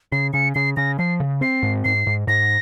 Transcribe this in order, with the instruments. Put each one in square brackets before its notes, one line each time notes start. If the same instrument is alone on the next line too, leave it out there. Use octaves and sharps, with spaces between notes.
[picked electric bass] C#3 [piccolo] C7
[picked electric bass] C#3 [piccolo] C#7
[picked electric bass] C#3 [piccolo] C7
[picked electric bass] C#3 [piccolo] A#6
[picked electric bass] F3 [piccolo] C7
[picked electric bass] C#3
[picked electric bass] C4 [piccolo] C7
[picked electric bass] G#2
[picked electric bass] G#2 [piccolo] C7
[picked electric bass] G#2
[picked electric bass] G#2 [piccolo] A#6